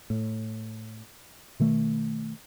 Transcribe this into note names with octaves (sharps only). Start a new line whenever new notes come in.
A2
B2 D#3 A3